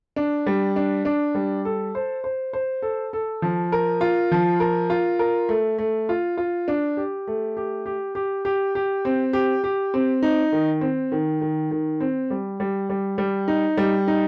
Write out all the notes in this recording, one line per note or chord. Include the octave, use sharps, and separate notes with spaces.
D4
G3
D4
D4
G3
A4
C5
C5
C5
A4
A4
F3
A#4
F4
F3
A#4
F4
A#4
A3
A3
F4
F4
D4
G4
A3
G4
G4
G4
G4
G4
C4
G4
G4
C4
D#4
D#3
C4
D#3
D#3
D#3
C4
G3
G3
G3
G3
D#4
G3
D#4